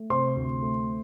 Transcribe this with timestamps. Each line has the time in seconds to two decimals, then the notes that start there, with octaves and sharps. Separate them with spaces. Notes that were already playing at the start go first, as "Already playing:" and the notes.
Already playing: A3
0.10 C3 C5 C6
0.36 D2
0.62 A3